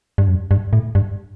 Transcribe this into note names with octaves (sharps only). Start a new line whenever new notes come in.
G2
F#2
G2
A2
G2